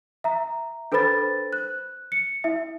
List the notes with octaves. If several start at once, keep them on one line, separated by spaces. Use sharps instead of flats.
E5 A#5
D4 A4 B4 C5 B5 A6
F#6
C#7
E4 E5